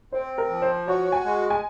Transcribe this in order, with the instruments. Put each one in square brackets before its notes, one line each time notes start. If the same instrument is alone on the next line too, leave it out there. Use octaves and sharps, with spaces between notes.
[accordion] C4 [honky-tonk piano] C5
[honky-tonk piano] A#4
[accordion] F3
[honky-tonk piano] C5
[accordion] F#4 [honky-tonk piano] C#5
[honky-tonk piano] G#5
[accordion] G#3
[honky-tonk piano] G#5